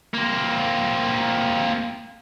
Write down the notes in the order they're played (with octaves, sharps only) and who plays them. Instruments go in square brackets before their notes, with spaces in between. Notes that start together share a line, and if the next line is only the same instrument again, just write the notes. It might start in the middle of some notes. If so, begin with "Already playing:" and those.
[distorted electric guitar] A#3 C4